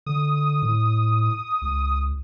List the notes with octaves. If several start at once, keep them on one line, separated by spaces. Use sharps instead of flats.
D3 D#6
A2
C#2